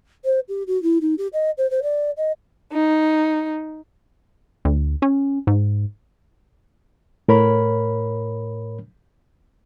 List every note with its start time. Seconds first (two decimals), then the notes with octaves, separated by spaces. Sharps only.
0.25 C5
0.48 G4
0.67 F#4
0.83 E4
1.01 D#4
1.18 G4
1.33 D#5
1.58 C5
1.70 C5
1.82 D5
2.17 D#5
2.72 D#4
4.65 D2
5.02 C#4
5.47 G#2
7.28 A2 A#4 C#5 B5